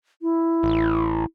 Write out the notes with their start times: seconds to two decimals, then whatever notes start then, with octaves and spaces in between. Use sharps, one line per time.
0.22 E4
0.63 A1